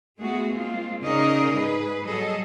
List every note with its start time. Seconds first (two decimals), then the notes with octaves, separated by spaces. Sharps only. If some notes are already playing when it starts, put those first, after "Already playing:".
0.18 G#3 A3 B3 F#4 G#4
0.52 G#3 A#3 C4 F4
1.03 C#3 D#4 G#4 A#4 D5 D#5
1.55 G#2 G#4 B4
2.05 F#3 G3 G#4 A4 D#5